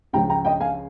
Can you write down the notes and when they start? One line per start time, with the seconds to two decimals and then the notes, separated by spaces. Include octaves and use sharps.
0.13 C#2 C#3 F3 G5 A#5
0.30 G5 A#5
0.45 D#5 G5
0.60 F5 G#5